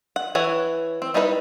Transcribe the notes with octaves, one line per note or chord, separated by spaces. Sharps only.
F#5
E3 C#5 F#5
C4
G3 D#4 E4 A#4 B4